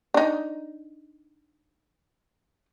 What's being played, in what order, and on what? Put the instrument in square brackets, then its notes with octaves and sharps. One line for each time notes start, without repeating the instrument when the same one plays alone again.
[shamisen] D4 D#4